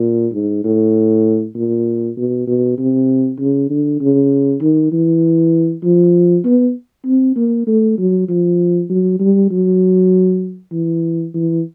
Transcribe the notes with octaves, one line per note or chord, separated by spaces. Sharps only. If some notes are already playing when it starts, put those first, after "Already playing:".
Already playing: A#2
G#2
A2
A#2
B2
B2
C3
C#3
D3
C#3
D#3
E3
F3
B3
C4
A#3
A3
F#3
F3
F#3
G3
F#3
E3
E3